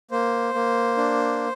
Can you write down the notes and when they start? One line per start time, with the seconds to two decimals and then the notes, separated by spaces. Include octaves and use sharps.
0.11 A#3 C5
0.54 A#3
0.97 D4